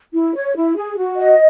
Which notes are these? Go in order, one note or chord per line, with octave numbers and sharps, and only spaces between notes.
E4
C#5
E4
G#4
F#4
D#5